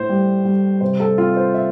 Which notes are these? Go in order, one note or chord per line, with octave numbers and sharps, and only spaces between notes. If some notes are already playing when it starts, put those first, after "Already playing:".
Already playing: A2 C5
G3
G3
C3 C5
A4
C4 F4
C5
E5